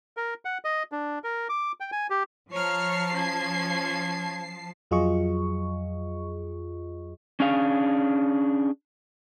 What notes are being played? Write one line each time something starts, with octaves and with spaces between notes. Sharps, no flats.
A#4
F#5
D#5
D4
A#4
D6
G5
G#5
G4
F3 C#5 A5 A#5 F6 C7
C#4 G#6
F2 F#3 F4 G#4 D#5 C#6
C#4 D4 G#4 F5